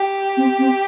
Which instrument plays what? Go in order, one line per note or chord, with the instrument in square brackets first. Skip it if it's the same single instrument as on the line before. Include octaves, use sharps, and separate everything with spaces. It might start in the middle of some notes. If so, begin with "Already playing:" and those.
Already playing: [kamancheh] G4
[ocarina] C4
C4